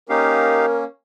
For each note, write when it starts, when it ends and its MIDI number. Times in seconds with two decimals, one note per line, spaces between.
0.10 0.84 58
0.10 0.84 61
0.10 0.66 63
0.10 0.66 67
0.10 0.85 70
0.10 0.66 77